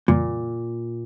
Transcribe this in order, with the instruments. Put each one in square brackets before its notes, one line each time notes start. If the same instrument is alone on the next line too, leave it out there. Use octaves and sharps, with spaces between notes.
[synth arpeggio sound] F2 C#3 E3 G3 A#3 [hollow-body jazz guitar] A#2